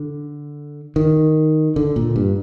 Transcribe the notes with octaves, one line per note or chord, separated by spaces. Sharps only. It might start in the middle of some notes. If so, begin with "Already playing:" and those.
Already playing: D3
D#3
D3
A#2
G2